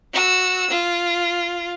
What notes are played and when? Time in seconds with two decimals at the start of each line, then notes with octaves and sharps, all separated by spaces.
0.13 F#4 E6
0.71 F4